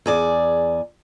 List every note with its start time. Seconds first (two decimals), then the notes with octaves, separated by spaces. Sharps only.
0.06 E2 G#4 D5